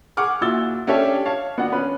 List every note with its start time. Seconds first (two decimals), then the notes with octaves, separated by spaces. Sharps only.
0.17 G#4 F#5 C#6 D6 F6
0.41 A#2 E4 F#4 E6 A6 G7
0.87 C#4 D4 G4 A4 C#5 E5
1.25 C#5 F5 A5
1.58 B3 D4 F#4 F#5
1.72 C#4 B4